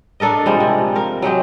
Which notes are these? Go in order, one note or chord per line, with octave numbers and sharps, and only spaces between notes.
D4 A4 A#4 D#5
C3 F3 G3 G#3
C3
A#4 F5
F#3 G#3 G4 D#5